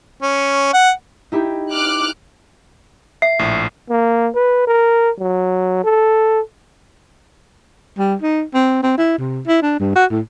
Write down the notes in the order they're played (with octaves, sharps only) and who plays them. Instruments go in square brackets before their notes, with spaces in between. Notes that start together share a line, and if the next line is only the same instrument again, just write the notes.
[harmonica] C#4
F#5
[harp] D#4 E4 G4
[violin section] D6 F6 F#6
[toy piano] E5 [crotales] C7
[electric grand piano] A#1 A2
[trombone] A#3
B4
A#4
F#3
A4
[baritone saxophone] G3
D#4
C4
C4
E4
C3
E4
D4
G2
F#4
A2